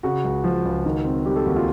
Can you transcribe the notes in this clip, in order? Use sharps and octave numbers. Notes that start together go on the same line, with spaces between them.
C#3 F#4
C#2
F3
C#2
D#3
C4
G3 G4
A4
D#2 F#4
F4